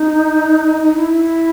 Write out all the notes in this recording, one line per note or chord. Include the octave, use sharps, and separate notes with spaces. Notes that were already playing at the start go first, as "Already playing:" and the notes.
Already playing: D#4
D#4
E4